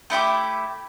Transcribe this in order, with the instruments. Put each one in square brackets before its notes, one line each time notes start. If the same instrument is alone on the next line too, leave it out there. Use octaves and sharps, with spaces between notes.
[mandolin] A3 E4 G4 D6